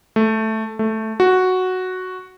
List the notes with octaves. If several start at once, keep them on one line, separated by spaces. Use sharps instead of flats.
A3
A3
F#4